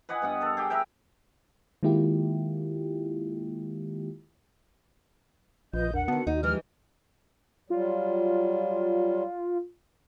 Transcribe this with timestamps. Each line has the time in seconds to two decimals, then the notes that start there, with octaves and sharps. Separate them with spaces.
0.09 B4 D#5 F#5 G#5
0.22 G2 B3 F#5
0.41 A4 A#4
0.57 G4 G#4
0.70 A#4 B4 E5 G5
1.83 D#3 G#3 A#3 E4 F4 G4
5.74 A#1 F3 F4 B4 D#5 G6
5.94 E2 D4 A#4 F#5
6.08 D3 D#3 B3 F#4
6.27 D#2 D#4
6.43 E3 F3 G#3 D#4 G4 F6
7.70 F#3 G3 F4